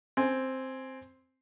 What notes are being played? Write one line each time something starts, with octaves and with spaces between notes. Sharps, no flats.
C4 G#5